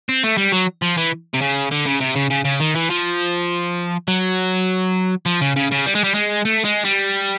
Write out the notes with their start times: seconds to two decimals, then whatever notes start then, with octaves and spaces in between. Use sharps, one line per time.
0.09 C4
0.24 A3
0.38 G3
0.52 F#3
0.82 F3
0.97 E3
1.34 C3
1.41 C#3
1.71 D3
1.86 C#3
2.01 C3
2.16 C#3
2.31 C#3
2.45 C#3
2.60 D#3
2.75 E3
2.90 F3
4.08 F#3
5.26 F3
5.41 C#3
5.56 C#3
5.71 C#3
5.86 G3
5.95 G#3
6.04 G3
6.15 G#3
6.45 A3
6.65 G#3
6.85 G3